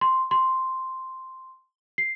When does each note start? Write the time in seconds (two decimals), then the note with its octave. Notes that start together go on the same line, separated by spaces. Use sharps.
0.01 C6
0.31 C6
1.98 C7